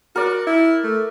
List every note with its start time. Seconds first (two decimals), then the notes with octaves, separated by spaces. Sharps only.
0.16 F#4 A#4 D5
0.47 E4
0.84 A3